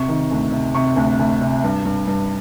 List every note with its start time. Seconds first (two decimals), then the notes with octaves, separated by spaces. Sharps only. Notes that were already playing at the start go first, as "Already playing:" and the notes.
Already playing: C3 C#6
0.08 D#3
0.31 D2
0.52 C3
0.75 C3 C#6
0.96 D2
1.19 D2
1.41 C3
1.64 G2
1.85 G2
2.07 G2